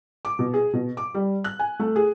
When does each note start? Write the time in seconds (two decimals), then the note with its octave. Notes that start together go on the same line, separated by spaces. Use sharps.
0.25 D6
0.39 B2
0.54 G#4
0.73 B2
0.97 D6
1.14 G3
1.44 F#6
1.59 G#5
1.79 A3
1.96 G#4